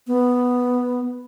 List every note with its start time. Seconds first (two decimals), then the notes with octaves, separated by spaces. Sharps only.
0.07 B3